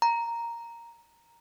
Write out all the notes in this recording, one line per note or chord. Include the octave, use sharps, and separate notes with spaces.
A#5